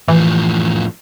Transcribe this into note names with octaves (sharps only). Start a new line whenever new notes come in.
A2 E3 F3